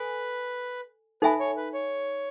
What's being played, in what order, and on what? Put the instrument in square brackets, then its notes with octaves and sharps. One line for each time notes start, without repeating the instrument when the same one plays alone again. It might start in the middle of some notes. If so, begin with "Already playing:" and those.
Already playing: [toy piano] A4 G#5 [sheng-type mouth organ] B4
[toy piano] D#4 A4 E5 G#5 B5 [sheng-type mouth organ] B4
[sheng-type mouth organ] C#5
B4
C#5